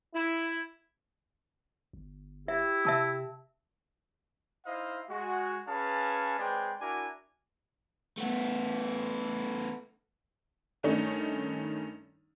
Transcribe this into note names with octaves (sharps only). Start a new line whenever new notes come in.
E4
G1
E4 G4 E5
C3 E5 A5 E6
D#4 E4 C5 D#5 F5
G#3 F#4
C#4 G#4 B4 F5 A5
G#3 C4 B4 C5 D5 G5
D4 E4 F#4 A#4 G#5 D6
A3 B3
G2 D#3 A3 C#4 D#4